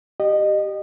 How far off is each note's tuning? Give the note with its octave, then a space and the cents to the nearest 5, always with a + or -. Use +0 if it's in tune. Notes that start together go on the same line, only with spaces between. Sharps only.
G4 -10 D#5 -25